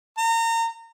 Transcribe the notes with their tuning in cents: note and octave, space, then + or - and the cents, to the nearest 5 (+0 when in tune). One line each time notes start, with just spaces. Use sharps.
A#5 -30